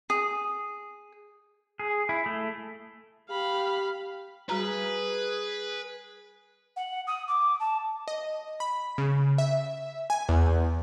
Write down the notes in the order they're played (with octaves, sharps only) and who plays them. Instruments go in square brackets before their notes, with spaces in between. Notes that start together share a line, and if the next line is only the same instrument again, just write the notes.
[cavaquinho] G#4
[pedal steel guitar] G#4
E4
A3
[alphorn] G4 [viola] F5 B5
[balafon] G3 F#4 A#5 [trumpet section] G#4 [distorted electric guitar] B4
[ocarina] F#5
D#6
D6
A5
[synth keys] D#5
B5
C#3
E5
G#5
E2